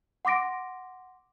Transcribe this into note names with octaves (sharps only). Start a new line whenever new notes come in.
F#5 C6 D6 A#6 D7